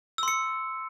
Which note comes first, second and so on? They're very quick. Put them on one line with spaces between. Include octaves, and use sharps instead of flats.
E6 C6 C#7